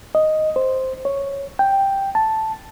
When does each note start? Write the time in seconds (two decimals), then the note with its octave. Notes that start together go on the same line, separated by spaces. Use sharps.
0.15 D#5
0.56 C5
1.05 C#5
1.59 G5
2.15 A5